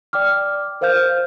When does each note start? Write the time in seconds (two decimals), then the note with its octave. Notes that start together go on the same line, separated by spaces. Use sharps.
0.13 D5 G5 D6 F6
0.81 A#4 C5 F5 F6 G6